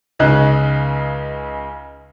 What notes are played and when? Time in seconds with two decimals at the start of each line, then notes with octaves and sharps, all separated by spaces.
0.19 C#2 C#3 D#4 F#6